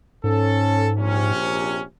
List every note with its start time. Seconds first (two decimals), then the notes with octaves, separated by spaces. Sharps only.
0.24 G#2 C#4 A4
0.97 A#1 C3 C#4